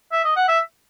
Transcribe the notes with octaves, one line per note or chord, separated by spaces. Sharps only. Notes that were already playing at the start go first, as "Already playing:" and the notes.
E5
D#5
F#5
E5